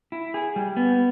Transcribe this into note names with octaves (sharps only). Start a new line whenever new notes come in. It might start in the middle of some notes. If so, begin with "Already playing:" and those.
E4
G#4
G3
B3